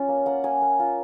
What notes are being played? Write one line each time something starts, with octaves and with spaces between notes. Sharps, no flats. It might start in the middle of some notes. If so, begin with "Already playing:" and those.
Already playing: C#4 F4 G#5
A#3
A#3 F#5
A#3 G#5
A#3
F4